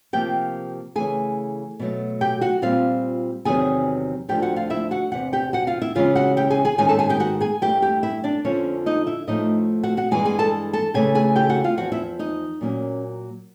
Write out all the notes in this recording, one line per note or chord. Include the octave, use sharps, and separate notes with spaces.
C3 F3 A#3 G4 G5
C#3 E3 A3 G#4 G#5
B2 F#3 A3
G4 G5
F#4 F#5
A#2 G3 C4 F4 F5
E2 C3 D#3 F#3 B3 G#4 G#5
D2 D3 F3 G4 G5
F#4 F#5
F4 F5
E4 E5
F#4 F#5
E2 C3 F#5
G4 G5
F#4 F#5
F4 F5
E4 E5
C#3 E3 G#3 C#4 F4 F5
F#4 F#5
G4 G5
G#4 G#5
G#4 G#5
G#2 D#3 G#3 C#4 G#4 G#5
A4 A5
G#4 G#5
G4 G5
F#4 F#5
G#4 G#5
G2 E3 A3 G4 G5
G4 G5
E4 E5
D4 D5
F2 D3 F3 C#4 C#5
D#4 D#5
E4 E5
A2 F3 A3 D#4 D#5
F#4 F#5
F#4 F#5
G2 E3 G#3 G#4 G#5
G#4 G#5
A4 A5
A4 A5
C#3 E3 A3 G#4 G#5
G#4 G#5
G4 G5
F#4 F#5
F4 F5
E2 C3 F3 F#4 F#5
E4 E5
D#4 D#5
A#2 F#3 A#3 C#4